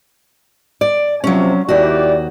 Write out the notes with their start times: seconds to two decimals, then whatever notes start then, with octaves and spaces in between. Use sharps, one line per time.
0.81 D5
1.24 C3 F3 F#3 C#4
1.69 D#2 E4 F#4 G4 D5